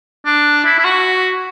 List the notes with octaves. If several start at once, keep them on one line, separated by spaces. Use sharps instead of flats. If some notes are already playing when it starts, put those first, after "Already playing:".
D4
E4
E4
F#4